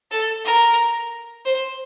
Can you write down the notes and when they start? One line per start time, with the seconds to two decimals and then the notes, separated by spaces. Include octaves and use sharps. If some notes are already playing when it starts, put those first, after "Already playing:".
0.11 A4
0.45 A#4
1.46 C5